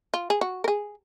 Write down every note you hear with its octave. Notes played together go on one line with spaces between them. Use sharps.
F4
G#4
F#4
A#4
G#4